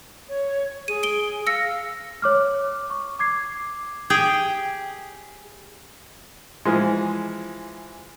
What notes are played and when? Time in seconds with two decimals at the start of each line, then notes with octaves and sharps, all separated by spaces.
0.29 C#5
0.88 G#4 D#7
1.03 D7 G7
1.47 F5 E6 A#6 C#7
2.22 C#5 D6 F6
2.90 C#6
3.19 D6 G#6 C7
4.10 G4 G#4 G5
6.65 E3 F3 G#3